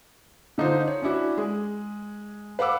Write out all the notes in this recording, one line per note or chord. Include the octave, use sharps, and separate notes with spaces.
D3 D#4 F4 C5
C#5
C#4 D4 E4 F#4
G#3 G#4
B4 F5 F#5 D6 E6